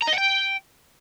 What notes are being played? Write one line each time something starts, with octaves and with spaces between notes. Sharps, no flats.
A#5
D#5
F#5
G5